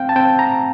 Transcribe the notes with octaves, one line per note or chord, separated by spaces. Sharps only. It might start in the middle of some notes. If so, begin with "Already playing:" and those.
Already playing: C4 F5 G5
A5
C4 G5
A#5